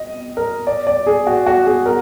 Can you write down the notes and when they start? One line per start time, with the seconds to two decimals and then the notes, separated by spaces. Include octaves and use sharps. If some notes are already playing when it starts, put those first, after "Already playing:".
Already playing: D#5
0.37 A#4
0.67 D5
0.87 D5
1.07 G#4
1.27 F#4
1.47 F#4
1.66 G#4
1.86 A#4